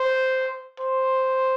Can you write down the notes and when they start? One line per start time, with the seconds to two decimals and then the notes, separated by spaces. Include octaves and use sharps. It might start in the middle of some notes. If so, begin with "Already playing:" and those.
Already playing: C5
0.80 C5